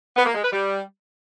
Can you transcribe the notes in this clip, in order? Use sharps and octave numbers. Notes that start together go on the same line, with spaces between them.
B3
A#3
G#3
B4
G3